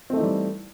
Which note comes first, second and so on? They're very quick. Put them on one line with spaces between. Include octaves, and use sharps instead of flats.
C4 A3 D#4 E3 G3